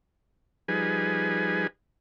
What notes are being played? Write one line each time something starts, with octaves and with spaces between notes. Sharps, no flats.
F3 G3 D#4 G#4 B4 G#5